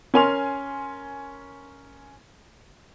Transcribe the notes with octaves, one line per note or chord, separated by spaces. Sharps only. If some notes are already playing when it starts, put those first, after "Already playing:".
C#4 A#4 G#5 C6 F7